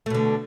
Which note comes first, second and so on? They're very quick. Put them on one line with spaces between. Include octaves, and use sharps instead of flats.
A3 B2 D3